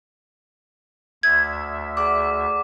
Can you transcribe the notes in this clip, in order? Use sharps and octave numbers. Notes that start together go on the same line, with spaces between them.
D2 E5 G#6
G#4 D5 F#5 D6